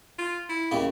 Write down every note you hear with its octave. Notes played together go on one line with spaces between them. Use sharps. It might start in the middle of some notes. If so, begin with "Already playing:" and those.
F4
E4
D#2 C#3